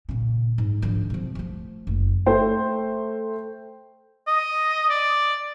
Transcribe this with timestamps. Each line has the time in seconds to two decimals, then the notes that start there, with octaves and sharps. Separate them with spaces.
0.09 A#2 C#3
0.58 G#2
0.82 D3 F3
1.10 C3 F3
1.35 F3 A3
1.87 F#1
2.26 A3 C5 G5
4.27 D#5
4.89 D5